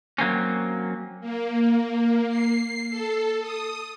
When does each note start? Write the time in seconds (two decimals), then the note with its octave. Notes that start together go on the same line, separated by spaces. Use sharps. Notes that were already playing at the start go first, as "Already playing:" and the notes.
0.18 F#3 A#3 C4 C#4
1.21 A#3
1.72 A#3
2.29 C7
2.90 A4
3.41 D#6